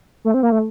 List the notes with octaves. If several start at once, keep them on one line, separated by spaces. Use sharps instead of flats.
A3
C4
A#3
A3